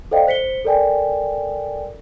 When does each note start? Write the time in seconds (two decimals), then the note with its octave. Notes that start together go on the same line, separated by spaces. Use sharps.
0.11 A4 C5 D5 D#5 F5 G5
0.27 C5 B6 C#7 G7
0.64 A4 A#4 D5 G5 G#5